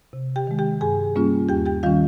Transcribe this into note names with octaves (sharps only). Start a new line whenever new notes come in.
C3
G4 G5
D#3 G#3
G4 G5
G2 G#4 G#5
G3 A#3 C#4 F4
D#2 G4 G5
G4 G5
D#3 G3 C#4 F4 F5